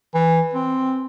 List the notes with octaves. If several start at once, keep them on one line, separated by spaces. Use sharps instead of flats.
E3
C4